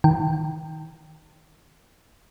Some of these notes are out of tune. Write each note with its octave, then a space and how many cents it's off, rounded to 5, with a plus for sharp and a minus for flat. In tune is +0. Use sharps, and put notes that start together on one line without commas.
D#3 +20 G5 +0